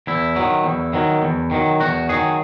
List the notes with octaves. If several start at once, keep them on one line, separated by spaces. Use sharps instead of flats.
E2 E4
D#3 F#3
E2
D#3 F#3
E2
D#3 F#3
E2 F#4
D#3 F#3 G#4